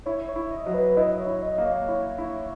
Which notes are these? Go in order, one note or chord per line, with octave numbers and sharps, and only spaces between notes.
E4 C#5
C#5
E4
D#5
F#3
B4
E4 D#5
C#5
E4
D#5
A#3
C#5
E4
E4